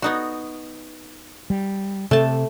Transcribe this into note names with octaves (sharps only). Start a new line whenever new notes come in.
B3 D#4 F#4
G3
C3 A3 A5